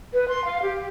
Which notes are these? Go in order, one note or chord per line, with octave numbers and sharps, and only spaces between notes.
B4
C6
F5
G4